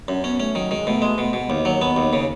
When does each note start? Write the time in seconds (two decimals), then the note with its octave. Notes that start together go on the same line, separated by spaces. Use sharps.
0.08 F#2 C#4
0.24 B3 C#4
0.39 A3 C#4
0.55 D#3 F#3
0.71 D#3 G#3
0.87 B2 A3
1.02 G#3
1.18 B2 A3
1.33 B2 G#3
1.50 D#2 D#3
1.65 D#3 F#3
1.81 B3
1.96 D#2
2.13 C#3